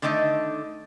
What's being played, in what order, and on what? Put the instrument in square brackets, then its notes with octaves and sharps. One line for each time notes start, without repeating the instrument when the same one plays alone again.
[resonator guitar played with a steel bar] D3 D#3 A3 D4 D#4